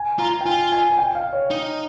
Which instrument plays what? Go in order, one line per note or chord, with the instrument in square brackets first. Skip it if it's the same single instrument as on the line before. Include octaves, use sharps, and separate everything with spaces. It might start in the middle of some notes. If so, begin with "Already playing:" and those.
Already playing: [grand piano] G#5
[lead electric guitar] F4 [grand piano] A#5
[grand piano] G5
[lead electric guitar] F4 [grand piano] G#5
[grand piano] G#5
G#5
G5
F5
C#5
[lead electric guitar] D#4